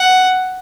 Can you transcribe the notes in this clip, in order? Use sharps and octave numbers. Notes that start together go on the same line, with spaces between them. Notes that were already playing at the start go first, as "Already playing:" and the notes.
Already playing: F#5